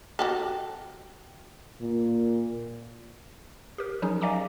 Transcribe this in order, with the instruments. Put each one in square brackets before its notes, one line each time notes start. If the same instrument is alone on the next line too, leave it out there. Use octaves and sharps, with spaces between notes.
[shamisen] F#4 G4 A4
[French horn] A#2
[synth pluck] G4 A#4
F3 F#3 C#4 D#4 G#4
D5 D#5 F5 G#5 A#5 D6